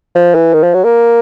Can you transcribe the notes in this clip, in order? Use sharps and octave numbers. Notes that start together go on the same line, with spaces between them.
F3
E3
D#3
F3
F#3
A#3